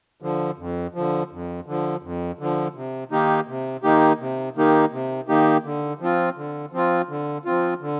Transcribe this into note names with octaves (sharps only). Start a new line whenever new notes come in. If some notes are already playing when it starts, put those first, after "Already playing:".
D3 F3
F2
D3 F3
F2
D3 F3
F2
D3 F3
C3
D#3 A#3 D#4 G4
C3
D#3 A#3 D#4 G4
C3
D#3 A#3 D#4 G4
C3
D#3 A#3 D#4 G4
D3
F3 C4 F4
D3
F3 C4 F4
D3
F3 C4 F4
D3